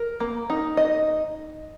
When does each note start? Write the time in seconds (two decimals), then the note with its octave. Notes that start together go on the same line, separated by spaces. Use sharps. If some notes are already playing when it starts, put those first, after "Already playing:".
Already playing: A#4
0.20 A#3
0.50 D#4
0.77 D#5